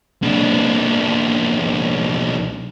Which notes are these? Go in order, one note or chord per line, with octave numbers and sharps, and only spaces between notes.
B1 D4